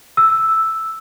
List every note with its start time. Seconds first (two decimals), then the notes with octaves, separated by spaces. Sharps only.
0.17 E6